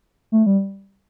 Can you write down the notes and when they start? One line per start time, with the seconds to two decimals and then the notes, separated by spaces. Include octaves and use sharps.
0.32 A3
0.46 G3